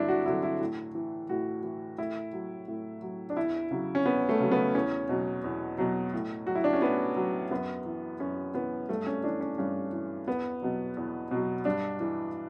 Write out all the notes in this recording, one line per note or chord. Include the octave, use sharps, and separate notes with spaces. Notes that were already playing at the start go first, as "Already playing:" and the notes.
Already playing: G2 D3 F#3 D4 E4
F#4
D3 F#3 E4
E4
A2
E3
A2 F#4
E3
A2 E4
F#3
A2
F#3
D4
E2 E4
C#3 F#3
C#4
E2 B3
A3
C#3 F#3
B3
E2 C#4
B2 F#3
E2
B2 F#3
A2
F#3 F#4
E4
D4
C#4
A2 B3
F#3
F#2 B3
E3
F#2 C#4
E3 B3
G2 A3
C#4
E3 D4
C#4
G2 C#4
E3
E2 B3
B2 F#3
E2
B2 F#3
G2 D4
E3